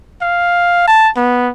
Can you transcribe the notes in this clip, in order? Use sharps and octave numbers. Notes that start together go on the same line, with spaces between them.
F5
A5
B3